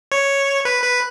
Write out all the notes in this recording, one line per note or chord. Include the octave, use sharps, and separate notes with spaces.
C#5
B4
B4